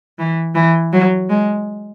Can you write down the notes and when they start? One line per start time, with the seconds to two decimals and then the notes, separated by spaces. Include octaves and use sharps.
0.19 E3
0.55 E3
0.93 F#3
1.29 G#3